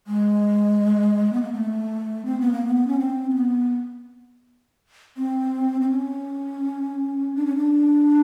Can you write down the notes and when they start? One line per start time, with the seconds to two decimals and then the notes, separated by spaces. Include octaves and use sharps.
0.07 G#3
1.33 B3
1.43 A#3
1.53 A3
2.25 C4
2.40 B3
2.52 A#3
2.66 B3
2.87 C#4
2.99 C4
3.30 C4
3.35 B3
5.17 C4
5.81 C4
5.90 C#4
7.36 D4
7.46 C#4
7.56 D4